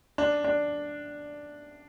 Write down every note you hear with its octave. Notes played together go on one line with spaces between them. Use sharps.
D4
D4